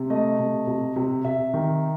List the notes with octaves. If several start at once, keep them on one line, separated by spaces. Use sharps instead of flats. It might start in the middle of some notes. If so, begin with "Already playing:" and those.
Already playing: C3
A3 D#5
C3
C3
C3
C3 E5
D#3